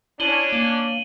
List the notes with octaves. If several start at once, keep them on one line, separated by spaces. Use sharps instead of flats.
C#4 D4 E4 D#7 F#7 G7
A#3